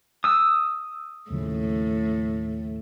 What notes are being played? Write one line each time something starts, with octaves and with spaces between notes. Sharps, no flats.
D#6 E6
D#2 A2 C#3 F3